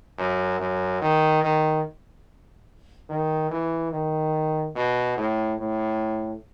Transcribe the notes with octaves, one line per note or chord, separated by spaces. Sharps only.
F#2
F#2
D#3
D#3
D#3
E3
D#3
B2
A2
A2